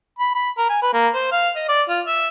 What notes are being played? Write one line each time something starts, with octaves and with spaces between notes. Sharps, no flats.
B5
B5
A#4
G#5
B4
A#3
C5
F5
D#5
D5
F4
E5